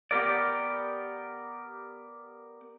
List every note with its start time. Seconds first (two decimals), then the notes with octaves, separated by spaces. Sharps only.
0.11 B3 G4 A#4 D5